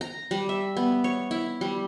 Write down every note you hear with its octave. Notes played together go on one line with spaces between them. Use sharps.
A#5
G3
E5
B3
C#5
E4
G3